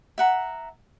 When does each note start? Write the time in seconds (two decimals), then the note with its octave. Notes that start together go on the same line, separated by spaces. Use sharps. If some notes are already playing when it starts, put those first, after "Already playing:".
0.18 E5 F#5 A#5